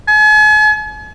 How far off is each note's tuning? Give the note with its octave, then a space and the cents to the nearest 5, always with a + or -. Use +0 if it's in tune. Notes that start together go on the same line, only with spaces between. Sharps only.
G#5 +45